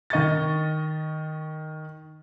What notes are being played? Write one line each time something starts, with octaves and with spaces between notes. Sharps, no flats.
D#3 D#5 C#6 A6